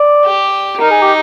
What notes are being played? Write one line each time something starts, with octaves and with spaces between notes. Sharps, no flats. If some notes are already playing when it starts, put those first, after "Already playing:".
Already playing: D5
G4
D#4 A#4
G#4
G4